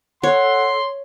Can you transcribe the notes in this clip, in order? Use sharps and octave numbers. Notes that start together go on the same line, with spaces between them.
A4 C#5 F#5 C6